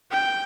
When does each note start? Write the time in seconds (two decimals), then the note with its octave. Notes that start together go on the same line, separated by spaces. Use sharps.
0.11 G5